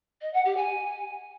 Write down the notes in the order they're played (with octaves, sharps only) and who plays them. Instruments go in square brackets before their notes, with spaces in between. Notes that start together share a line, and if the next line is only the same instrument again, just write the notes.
[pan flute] D#5
F#5
G4
G#5